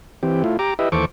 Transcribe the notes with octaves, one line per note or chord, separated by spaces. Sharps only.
E3 C4 G4
A3 E4 F4
G4 A#5 D6
E4 G4 B4 D#5 E5
D#2 E3 A4 C5 C#6 D6